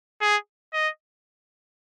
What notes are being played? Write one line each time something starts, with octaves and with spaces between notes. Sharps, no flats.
G#4
D#5